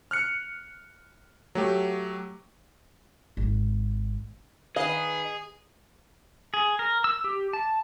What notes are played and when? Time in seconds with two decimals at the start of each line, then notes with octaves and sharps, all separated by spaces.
0.11 F6 F#6 C#7
1.55 F#3 A3 G4
3.37 G#1
4.76 D#3 G#4 B4 D#5 F5
6.54 G#4
6.79 A#4
7.04 E6
7.24 G4
7.53 A5